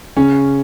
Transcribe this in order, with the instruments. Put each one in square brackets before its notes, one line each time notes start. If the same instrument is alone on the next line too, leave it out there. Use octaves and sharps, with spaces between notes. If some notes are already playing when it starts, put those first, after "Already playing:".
[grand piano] C#3 C#4